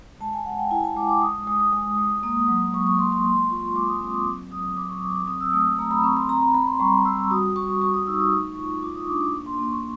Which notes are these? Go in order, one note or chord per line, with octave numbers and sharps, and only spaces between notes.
G#3 A5
G#5
G#3 F#5
G5
E4 G#5
A5
G#3 D6
D6
G#3 D#6
G#3 D#6
D#6
G#3
G#3
A#3 D#6
F#3
F#3 C#6
C#6
A#3 C6
C6
G#3 C6
F4 C#6
G#3 D6
D#6
C4 D#6
D6
F#3
F#3 D#6
F#3 D6
C#6
F#3 D6
D6
C4 D#6
E6
A3 D#6
A3 A#5
B5
C4 C#6
C6
C4 A#5
B5
C4 B5
C6
G3 C#6
G3 E6
F#4 D#6
F#4 C#6
F#4 C#6
D#6
D#4 E6
D#6
A3 C#6
F4
F4 D6
D#6
D4 D6
D6
A#3
C6
A#3
C#6